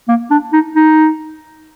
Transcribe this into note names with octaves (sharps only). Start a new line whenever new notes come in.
A#3
D4
D#4
D#4